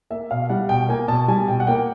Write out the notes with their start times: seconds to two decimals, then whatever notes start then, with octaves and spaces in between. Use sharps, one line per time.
0.10 A#3 E5
0.31 B2 F5
0.50 G3 F#5
0.69 B2 G5
0.89 A#3 G#5
1.08 B2 A5
1.28 G3 G#5
1.48 B2 G5
1.60 F#5
1.67 A#3 G5